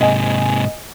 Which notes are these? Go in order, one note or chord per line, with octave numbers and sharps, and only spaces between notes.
G#2 C3 D#5 G#5